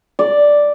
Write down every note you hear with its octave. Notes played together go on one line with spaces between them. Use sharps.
D5